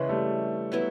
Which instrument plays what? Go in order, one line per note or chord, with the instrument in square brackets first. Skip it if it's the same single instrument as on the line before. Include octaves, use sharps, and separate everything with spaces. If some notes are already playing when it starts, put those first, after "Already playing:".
Already playing: [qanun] C#3 E3 G#3
[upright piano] G3 A3
[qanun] F#3 B3 E4